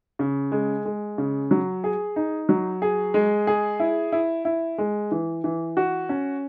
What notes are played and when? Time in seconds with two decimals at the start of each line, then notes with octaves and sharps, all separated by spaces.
0.19 C#3
0.52 G#3
0.85 G#3
1.18 C#3
1.51 F#3
1.84 G#4
2.16 D#4
2.49 F#3
2.82 G#4
3.14 G#3
3.47 G#4
3.80 E4
4.12 E4
4.45 E4
4.78 G#3
5.11 E3
5.44 E3
5.77 F#4
6.09 C#4